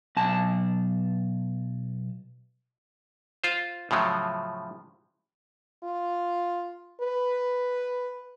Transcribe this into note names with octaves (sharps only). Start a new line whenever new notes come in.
B1 A5
F4 C5
A2 C#3 F3 F#3
F4
B4